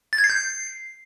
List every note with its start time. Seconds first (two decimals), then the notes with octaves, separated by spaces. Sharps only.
0.13 A6
0.18 G#6
0.24 C7
0.30 G6
0.35 C7